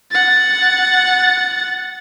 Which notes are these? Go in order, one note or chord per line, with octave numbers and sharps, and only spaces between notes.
F#5 A6